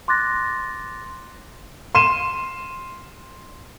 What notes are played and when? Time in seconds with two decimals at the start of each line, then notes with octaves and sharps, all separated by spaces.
0.08 C6 D6 F#6 A6 A#6
1.95 C6 D#7 E7